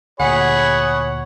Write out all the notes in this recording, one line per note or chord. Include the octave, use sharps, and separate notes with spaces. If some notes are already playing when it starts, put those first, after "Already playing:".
D2 A#2 G#4 C#5 F#5 B5